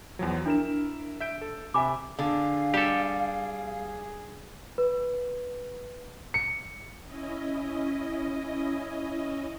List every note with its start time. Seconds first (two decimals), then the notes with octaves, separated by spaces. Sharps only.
0.19 E2 F3 F#3
0.46 D4 E4 A#4 E7
1.20 E5 G6 D7
1.42 A4
1.74 C3 E5 G#5 B5 D6
2.19 D3 G#4 F5
2.74 G3 G4 A4
4.78 B4
6.34 C#7
7.03 C#4 E4 D#5